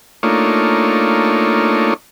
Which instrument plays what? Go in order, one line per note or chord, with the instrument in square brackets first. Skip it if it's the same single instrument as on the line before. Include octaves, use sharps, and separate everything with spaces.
[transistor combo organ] A3 A#3 D4 D#4 F4 C#5